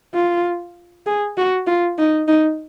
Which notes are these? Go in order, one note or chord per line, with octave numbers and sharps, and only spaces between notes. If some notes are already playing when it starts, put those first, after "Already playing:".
F4
G#4
F#4
F4
D#4
D#4